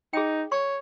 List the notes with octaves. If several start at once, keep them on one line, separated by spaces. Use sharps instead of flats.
D#4 G#4 G5
C#5 C#6